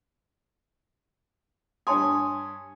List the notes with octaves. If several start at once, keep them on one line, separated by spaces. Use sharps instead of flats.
G2 C#5 G#5 A5 C6 D#6